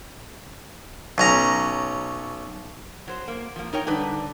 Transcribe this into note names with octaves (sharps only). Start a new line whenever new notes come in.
B1 C#4 A#5
F#3 C5
A#3
F3 A#3
D#4 A#4 C#5 G5
D3 G3 D4 D#4 B4